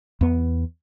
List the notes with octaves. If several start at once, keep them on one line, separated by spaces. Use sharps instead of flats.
E2 B3